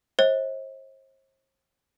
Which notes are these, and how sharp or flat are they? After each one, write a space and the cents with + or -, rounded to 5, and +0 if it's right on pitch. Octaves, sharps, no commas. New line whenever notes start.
C5 +40 D#5 +45